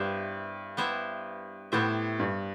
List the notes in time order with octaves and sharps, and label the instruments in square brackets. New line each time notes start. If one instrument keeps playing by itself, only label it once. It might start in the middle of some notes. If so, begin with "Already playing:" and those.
Already playing: [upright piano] G2 [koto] B3 E4 G4 C5 E5
[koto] B3 E4 G4 C5 E5
[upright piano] A2 [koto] B3 E4 G4 C5 E5
[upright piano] G2